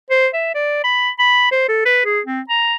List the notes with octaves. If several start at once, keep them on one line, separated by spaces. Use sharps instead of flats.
C5
E5
D5
B5
B5
C5
A4
B4
G#4
C4
A#5